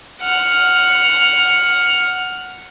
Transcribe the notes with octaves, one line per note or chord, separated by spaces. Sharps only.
F#5 F6